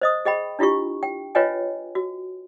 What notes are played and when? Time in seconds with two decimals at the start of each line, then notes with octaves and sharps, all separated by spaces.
0.01 C5 D#5 D#6
0.25 G#4 D#5 G5 B5
0.59 D4 E4 F4 G4 C#6
1.03 G5
1.35 F4 B4 C#5 D#5 G5 G#5
1.95 F#4